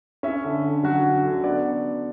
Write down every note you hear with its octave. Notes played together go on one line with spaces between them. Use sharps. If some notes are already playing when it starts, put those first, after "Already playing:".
C#4 E5
D3
D3
F#3 F#4 F#5
C#4
D3
B3 D5